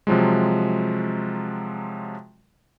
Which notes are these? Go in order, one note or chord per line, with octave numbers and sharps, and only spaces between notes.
C3 F3 F#3 G#3